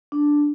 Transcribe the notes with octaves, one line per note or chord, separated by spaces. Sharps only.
D4